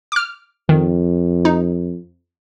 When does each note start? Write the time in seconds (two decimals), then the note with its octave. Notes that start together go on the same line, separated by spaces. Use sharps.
0.12 D6 F6
0.69 F2 D#3
1.45 D#4